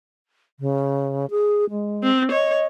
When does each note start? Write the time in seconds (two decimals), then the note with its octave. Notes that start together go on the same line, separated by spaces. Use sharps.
0.60 C#3
1.30 G#4
1.70 G#3
2.03 C4
2.32 C#5 D#5